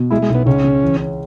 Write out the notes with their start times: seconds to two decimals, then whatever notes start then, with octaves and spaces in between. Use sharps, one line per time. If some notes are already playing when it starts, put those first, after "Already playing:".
Already playing: B2
0.11 G#3 E4
0.22 G#3
0.29 B1
0.35 B3
0.46 C#2 C#4
0.64 C#3
0.82 E3
1.00 C#4